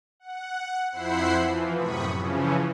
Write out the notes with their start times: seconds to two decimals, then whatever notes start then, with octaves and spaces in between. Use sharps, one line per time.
0.20 F#5
0.92 F2 E4 C5 F#5 B5 C7
1.36 E3 F3
1.76 F#2 A2 C3 B5 C#6 D#6
2.15 C#3 E3 F3 C#4